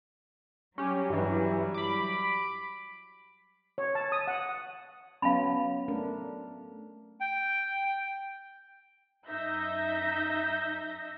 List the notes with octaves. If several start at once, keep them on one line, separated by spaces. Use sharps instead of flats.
F#3 G3 C#4 G4
G2 E3
B5 D6
C#5
A5
D#6
F#5
F#3 B3 C#4 F5 A5 B5
A3 D4 A#4
G5
F#2 D#4 E5 G6 A#6